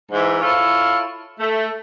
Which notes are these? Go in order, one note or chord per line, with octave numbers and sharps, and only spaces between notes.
G#2 E3
E4 F4 A4 C#5
A3